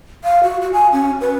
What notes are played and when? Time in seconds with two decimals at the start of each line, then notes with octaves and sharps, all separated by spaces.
0.24 F5
0.43 F#4
0.61 F#4
0.73 G#5
0.92 C#4
1.21 B4